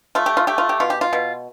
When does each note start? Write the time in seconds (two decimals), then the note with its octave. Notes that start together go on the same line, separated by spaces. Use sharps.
0.15 A3 F4
0.26 G4
0.37 F4
0.47 A3 G4
0.58 F4
0.69 G4
0.80 B2 F4
0.90 G4
1.01 F4
1.13 B2